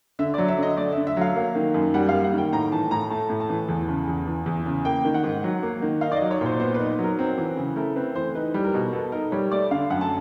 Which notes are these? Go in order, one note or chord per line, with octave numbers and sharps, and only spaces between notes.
D3 E5
F#3 D5
E5
D3 D#5
A3 D5
D3 E5
E5
F#3 F5
A#3
D#3
F#2
G3 F#5
A#3 F5
F#5
D#3
G5
A2 A#5
E3 A5
A2 A#5
A3 A5
A2
A5
E3
E2
C#3
E2
E3
E2
C#3
A#3 G5
D#3
F#5
G#2
F#3
A#3
D#3
D#4 F5
D5
D#5
F#3
C#5
A#2 C5
B3 C5
B4
D#4
F#3
A#4
C4
E3
C#3
A3 A#4
C4 B4
E3 C5
D#4 B4
G3
A#4
B2
B3 A4
D#4 A#4
G3 C#5
A3 D5
D3 F5
F#2 F#5
A5